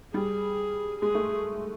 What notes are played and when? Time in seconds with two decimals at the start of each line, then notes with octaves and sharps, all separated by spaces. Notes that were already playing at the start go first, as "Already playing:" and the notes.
0.13 G3 G#4
1.02 G#3 G#4
1.15 A3